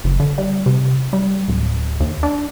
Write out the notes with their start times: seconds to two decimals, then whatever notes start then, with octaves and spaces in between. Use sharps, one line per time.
0.04 F#1
0.20 D3
0.38 G3
0.66 C3
1.13 G3
1.48 D1
2.00 D#2
2.23 D4